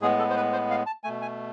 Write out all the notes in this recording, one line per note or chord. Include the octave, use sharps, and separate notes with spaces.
A2 G#3 B3 G#4
A4
C5
B4
C5
F5
A5
B2 A3 G#5
G#5